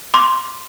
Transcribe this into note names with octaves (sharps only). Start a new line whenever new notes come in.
C6 D6